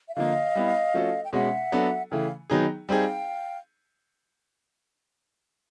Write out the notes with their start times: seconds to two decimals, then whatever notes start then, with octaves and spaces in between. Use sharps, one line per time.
0.09 E5
0.16 D3 F3 A#3 D#5 F5
0.55 G3 B3 E4
0.94 F3 A3 C#4 F#4 A4
1.24 G5
1.33 B2 G#3 C#4 E5 F#5
1.72 F#3 B3 D4 F#4 A4
2.11 C#3 E3 A3 F5 G5
2.50 D#3 F#3 B3 D#4 G#4
2.89 G3 C4 D#4 G#4 F5 G5